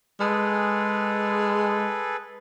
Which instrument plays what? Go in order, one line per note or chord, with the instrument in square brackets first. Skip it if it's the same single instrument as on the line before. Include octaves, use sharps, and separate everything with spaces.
[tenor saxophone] G#3 [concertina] G#4 A4 B4